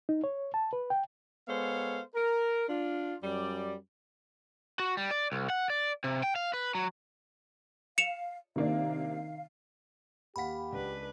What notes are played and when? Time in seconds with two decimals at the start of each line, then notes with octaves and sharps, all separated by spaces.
0.09 D#4
0.24 C#5
0.54 A5
0.73 B4
0.90 G5
1.48 G#3 B3 A4 C5 C#5 F5
2.15 A#4
2.69 D4 F4
3.22 F#2 G3 D5
4.80 F#4
4.97 G3
5.11 D5
5.32 C2
5.50 F#5
5.70 D5
6.04 C3
6.23 G5
6.36 F5
6.54 B4
6.75 F#3
7.98 F5 C#7 E7 F7
8.56 C3 D#3 A#3 D4 F5
10.36 D#2 G4 F5 F#5 B5 B6
10.72 C#2 D4 B4